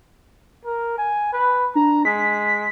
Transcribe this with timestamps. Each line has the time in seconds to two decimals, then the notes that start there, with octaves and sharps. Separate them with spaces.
0.65 A#4
0.98 G#5
1.33 B4
1.75 D4 A#5
2.05 G#3 B6